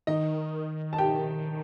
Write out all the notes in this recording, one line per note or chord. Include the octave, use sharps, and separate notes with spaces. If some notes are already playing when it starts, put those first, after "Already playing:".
D#3 D#4 D#5
A5
G4 G5